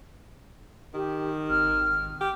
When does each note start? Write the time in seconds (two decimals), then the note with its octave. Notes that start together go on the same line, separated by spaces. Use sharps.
0.94 D#3 G4
1.50 G#1 F6
2.21 G4